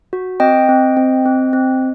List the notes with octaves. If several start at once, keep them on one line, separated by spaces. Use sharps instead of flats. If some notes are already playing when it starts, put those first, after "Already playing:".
F#4
C4 D#5 G5
C4
C4
C4
C4